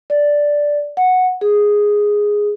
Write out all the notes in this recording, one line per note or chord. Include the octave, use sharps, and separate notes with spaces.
D5
F#5
G#4